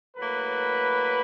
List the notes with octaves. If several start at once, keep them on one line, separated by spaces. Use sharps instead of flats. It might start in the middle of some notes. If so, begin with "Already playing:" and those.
A2 F#3 A#3 B4